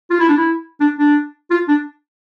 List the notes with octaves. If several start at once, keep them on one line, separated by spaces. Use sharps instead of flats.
F4
E4
D4
E4
D4
D4
F4
D4